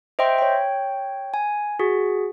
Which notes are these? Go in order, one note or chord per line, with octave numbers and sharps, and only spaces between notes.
C5 D#5 E5 G5 C6
C#5 G5
G#5
F#4 G#4